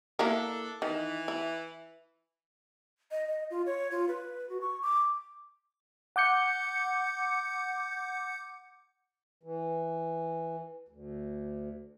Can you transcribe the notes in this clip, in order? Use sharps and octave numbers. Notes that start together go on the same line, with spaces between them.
A#3 D4 E4 A4 A#4
D#3 E3
E4
D#5
D#5
F4
C#5
F4
B4
F#4
C#6
D6
F#5 D6 G6 C#7
E3
D2